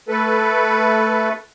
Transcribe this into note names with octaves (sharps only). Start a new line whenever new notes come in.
A3 A4 B4